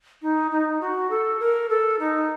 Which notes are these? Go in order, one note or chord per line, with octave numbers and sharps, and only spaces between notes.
D#4
D#4
F#4
A4
A#4
A4
D#4